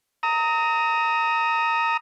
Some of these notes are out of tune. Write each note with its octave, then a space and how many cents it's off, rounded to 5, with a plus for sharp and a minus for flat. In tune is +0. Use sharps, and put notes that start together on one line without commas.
A#5 -20 D#6 +25